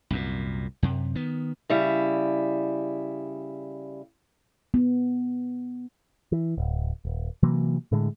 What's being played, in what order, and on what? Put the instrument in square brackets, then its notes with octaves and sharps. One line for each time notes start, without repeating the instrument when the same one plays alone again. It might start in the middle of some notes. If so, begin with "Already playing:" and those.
[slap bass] C2 F#2 A#2
F#2 C3
D#3 B3
[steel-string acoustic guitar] C#3 G3 E4
[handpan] B3
[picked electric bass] E3
D1
D#1
C3 E3 F#3 A#3
A2 D3 G#3